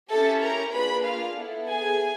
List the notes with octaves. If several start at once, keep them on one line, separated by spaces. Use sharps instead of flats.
C#4 E4 G4 A4 A5
A#4 A#5
A#3 D4 F4 G#4 B4 B5
F4 F5
B3 E4 A4
G#4 G#5